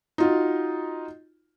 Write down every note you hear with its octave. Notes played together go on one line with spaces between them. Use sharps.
D#4 F4 F#4